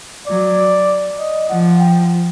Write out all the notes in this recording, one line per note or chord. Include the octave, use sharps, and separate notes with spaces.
F#3 D5
D#5
F3 F#5
G5